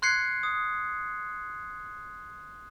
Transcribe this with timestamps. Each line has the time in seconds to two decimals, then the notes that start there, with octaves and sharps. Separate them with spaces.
0.02 C6 F#6 G#6 C7 C#7
0.43 D#6